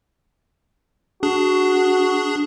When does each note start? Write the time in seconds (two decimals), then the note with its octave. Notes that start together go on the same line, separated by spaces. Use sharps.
1.23 D4 F#4 G#4